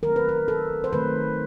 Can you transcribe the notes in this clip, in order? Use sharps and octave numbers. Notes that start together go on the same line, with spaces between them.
D#3 F#3 A3 C4 A#4
B4
A#4
A4
C5
D#3 F#3 A3 C4 B4